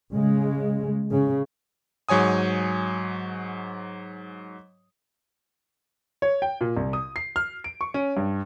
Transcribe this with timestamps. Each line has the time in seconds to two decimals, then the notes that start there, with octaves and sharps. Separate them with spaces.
0.13 C#3 G#3
1.11 C#3
2.09 G#2 F#3 C#5 G#5 D#6
6.22 C#5
6.42 G5
6.61 A#2
6.77 C2
6.93 D#6
7.16 C7
7.36 F6
7.64 D7
7.81 C#6
7.94 C#4
8.17 G2